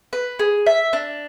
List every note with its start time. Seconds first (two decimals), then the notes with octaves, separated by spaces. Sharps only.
0.13 B4
0.39 G#4
0.66 E5
0.93 D4